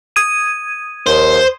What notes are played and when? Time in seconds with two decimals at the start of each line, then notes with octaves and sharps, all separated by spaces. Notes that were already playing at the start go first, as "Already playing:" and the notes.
0.16 D#6 G#6 D#7
1.06 D#2 C5